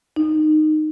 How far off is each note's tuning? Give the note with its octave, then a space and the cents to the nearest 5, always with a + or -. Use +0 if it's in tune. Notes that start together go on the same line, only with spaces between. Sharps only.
D#4 -15